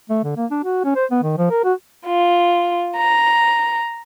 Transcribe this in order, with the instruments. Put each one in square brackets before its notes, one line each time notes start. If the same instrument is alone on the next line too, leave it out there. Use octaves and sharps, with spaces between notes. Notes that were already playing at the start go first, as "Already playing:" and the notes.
[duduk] A3
D3
A#3
D4
F#4
C#4
C5
B3
D#3
F3
A#4
F#4
[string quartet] F4
A#5